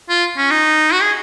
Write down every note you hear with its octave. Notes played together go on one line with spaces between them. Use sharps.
F4
C#4
D#4
F#4
G#4